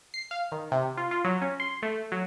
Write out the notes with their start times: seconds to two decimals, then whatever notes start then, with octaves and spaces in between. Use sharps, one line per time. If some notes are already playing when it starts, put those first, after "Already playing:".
0.14 C7
0.31 F5
0.52 D#3
0.72 C3
0.98 F4
1.11 F4
1.24 F#3
1.41 C#4
1.60 C6
1.82 A3
2.12 F#3